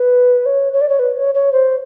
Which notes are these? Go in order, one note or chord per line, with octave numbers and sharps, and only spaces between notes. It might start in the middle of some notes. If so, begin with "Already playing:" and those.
Already playing: B4
C#5
C#5
D5
C#5
B4
C#5
C#5
C5